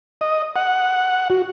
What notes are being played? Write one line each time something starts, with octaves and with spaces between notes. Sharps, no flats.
D#5
F#5
F#4